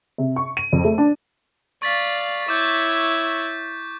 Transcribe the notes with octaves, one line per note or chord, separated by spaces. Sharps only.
C3
C#6
D#7
F2
A3
D4
D5 F5 C#6 A6 B6
E4 C#5 D6 G6